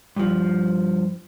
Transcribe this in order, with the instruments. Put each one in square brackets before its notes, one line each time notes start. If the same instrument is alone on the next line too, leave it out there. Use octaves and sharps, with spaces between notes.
[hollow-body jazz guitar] G2 F3